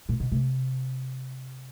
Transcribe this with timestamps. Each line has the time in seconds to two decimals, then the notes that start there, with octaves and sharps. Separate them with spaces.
0.09 A#2
0.20 B2
0.32 C3